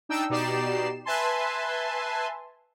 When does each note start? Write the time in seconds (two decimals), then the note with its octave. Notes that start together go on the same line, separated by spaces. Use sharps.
0.09 D4 D#4 G5 E6
0.30 B2 D#4 G4 D5 C7 E7
1.05 B4 E5 G#5 A5 C6